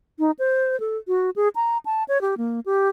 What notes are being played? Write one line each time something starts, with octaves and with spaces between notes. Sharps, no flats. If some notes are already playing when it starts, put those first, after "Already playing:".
D#4
C5
A4
F#4
G#4
A#5
A5
C#5
G4
A#3
G4